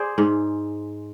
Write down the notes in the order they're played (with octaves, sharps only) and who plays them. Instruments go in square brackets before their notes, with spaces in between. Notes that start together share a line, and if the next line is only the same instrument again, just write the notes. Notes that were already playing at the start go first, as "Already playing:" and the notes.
Already playing: [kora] G#4 C5 D5
G#2